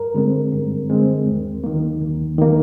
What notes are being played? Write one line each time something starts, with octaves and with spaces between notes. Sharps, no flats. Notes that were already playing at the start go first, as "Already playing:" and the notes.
Already playing: G2 A#4
D3 G#3 C4
G2
D3 G#3 C4
D#2
D#3 A#3
D#2
D#3 A#3